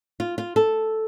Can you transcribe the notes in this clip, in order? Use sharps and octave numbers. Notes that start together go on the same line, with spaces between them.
F4
F4
A4